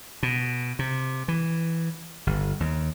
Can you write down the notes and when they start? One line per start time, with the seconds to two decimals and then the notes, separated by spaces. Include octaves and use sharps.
0.23 B2
0.79 C3
1.28 E3
2.27 G1
2.60 D#2